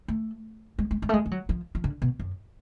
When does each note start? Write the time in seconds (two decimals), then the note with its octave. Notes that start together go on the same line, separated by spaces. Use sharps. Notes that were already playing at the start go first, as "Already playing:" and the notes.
0.08 A3
0.79 G#3
0.91 G#3
1.02 G#3
1.09 A3
1.14 G#3
1.26 G#3
1.31 F#3
1.49 F3
1.75 F3
1.84 D3
2.02 B2
2.19 F#2